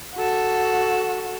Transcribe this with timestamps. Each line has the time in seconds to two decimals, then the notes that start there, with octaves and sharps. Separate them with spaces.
0.15 F#4 A4